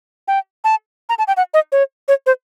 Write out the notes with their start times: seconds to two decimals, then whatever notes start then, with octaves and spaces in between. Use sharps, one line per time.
0.28 G5
0.64 A5
1.09 A#5
1.18 A5
1.28 G5
1.37 F#5
1.54 D#5
1.72 C#5
2.08 C#5
2.26 C5